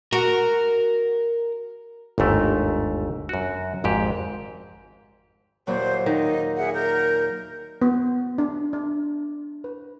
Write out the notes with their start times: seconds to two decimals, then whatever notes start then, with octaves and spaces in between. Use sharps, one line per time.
0.13 F#4 A#4
2.18 G1 D#2 G#2 A3 A#4
3.29 F#2 F#4
3.84 G#1 F2 G#2 G4
5.67 D#2 A#2 F#3 C5
6.06 D#3 D#4
6.57 G#4 E5 F#5
6.74 A#4 G6
7.82 B3
8.38 D4
8.73 D4
9.64 B4